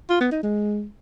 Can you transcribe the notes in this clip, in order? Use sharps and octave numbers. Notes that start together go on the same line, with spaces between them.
F4
B3
D#4
G#3